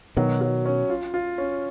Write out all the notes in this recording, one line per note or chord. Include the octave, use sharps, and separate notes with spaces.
B2 D#3 F#3
F#3
C#4
F4
F4
C#4